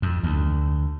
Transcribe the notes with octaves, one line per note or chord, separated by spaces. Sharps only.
F2
D2